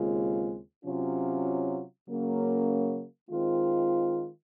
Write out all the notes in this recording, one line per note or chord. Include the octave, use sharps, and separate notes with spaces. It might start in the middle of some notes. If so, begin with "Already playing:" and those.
Already playing: D#2 C#3 G#3 C4 F4
C3 F#3 C#4 F4
C#3 F#3 A#3 C#4
D#3 G#3 C4 F4